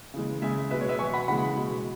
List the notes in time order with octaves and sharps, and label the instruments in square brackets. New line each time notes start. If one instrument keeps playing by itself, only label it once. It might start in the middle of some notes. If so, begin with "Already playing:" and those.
[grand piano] C#3 E3 G#3
C#3 G#3 E5 G#5
B2 G#3 B4 E5
C#5
B4 E5
B2 G#5 C#6
F#3
F#5 B5
C#3 E3 G#3 F#5 B5
B2 G#3